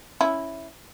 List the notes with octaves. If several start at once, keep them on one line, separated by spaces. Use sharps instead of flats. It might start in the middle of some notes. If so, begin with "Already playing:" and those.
C#4 E4